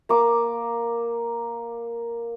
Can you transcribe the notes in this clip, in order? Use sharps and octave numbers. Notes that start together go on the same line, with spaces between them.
A#3 D6